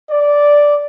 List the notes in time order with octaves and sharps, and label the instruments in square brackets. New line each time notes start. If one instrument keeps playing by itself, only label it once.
[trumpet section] D5